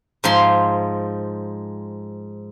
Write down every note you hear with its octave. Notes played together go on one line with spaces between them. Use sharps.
G#2 F3 C6